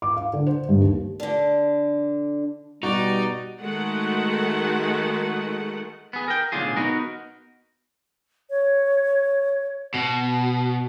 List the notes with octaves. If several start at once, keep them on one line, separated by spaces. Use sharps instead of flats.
D6
F5
D3
C5
G2
D#2
D3 D4
B2 G3 D#4 F#4 D5
D#3 G#3 A3 F#4 F#5
B3 G#4
A#4 G5
B1 A2 D3 F4 G#4
B3 D#4 F#4 A#4
C#5
B2